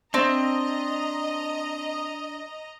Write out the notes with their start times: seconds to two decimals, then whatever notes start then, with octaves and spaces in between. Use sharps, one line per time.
0.14 C4 D4 D#5 A#5